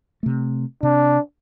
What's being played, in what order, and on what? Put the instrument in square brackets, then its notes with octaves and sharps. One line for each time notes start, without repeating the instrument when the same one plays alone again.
[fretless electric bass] C3 A3
[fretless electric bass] C3 [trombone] D4